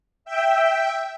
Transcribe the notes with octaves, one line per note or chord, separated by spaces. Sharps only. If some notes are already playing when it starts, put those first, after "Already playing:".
E5 G5